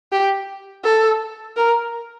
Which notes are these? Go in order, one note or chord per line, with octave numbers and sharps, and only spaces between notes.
G4
A4
A#4